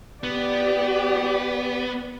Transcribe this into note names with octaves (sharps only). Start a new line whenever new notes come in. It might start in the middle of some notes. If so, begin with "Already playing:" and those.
B3 G4 D5